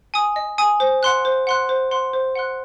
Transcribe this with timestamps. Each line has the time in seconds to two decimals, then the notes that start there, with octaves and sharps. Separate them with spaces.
0.14 G#5 D#6
0.36 D#5
0.58 G#5 D#6
0.80 C5
1.03 F#5 C6 F#6
1.25 C5
1.47 F#5 C6 F#6
1.69 C5
1.91 F#5 C6 F#6
2.13 C5
2.35 F#5 C6 F#6